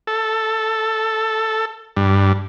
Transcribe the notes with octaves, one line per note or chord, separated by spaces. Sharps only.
A4
G2